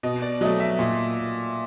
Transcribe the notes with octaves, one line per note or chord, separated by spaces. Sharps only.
B2 D#5
D5
F#3 A3 D#5
E5
A#2